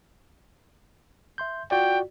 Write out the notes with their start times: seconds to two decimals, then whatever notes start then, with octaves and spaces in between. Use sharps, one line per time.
1.38 E5 C6 G6
1.71 F4 F#4 D5 G5